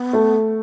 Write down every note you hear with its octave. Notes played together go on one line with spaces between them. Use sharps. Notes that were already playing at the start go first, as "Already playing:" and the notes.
Already playing: B3
A3